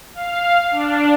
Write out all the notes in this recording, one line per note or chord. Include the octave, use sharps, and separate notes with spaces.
F5
D4